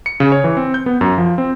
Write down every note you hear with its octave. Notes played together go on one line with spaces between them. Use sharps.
C#7
C#3
C#5
E3
C4
G6
B3
F#2
F3
C4